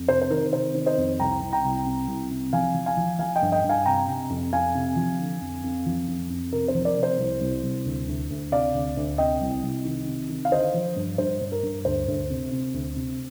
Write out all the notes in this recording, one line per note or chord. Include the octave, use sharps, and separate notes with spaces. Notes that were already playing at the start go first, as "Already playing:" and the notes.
Already playing: F2
C3 C5
C5
D#3 A#4
C3 C5
D#3
C5 D#5
F2
C2 G5 A#5
C2
G5 A#5
C2
C3
C2
C3
F3 F5 G#5
F3
F5 G#5
F3
F3 F5 G#5
D#5 G5
G2
D#5 G5
G2
F5 G#5
C3 G5 A#5
C3
F2
F2 F5 G#5
C3
F3
D3
F2
F2
F3
F2
F2
C3 A#4
C5
F3
A#4 D5
C3
C5
C2
C2
C2
D2
D2
D2
C3 D5 F5
D2
D2
C3 D#5 G5
C2
C2
D#3
C3
D#3
F5
D3 C5 D#5
F3
G2
G2 C5
G2
A#4
G2
D2 C5
D2
C3
C3
D2
C3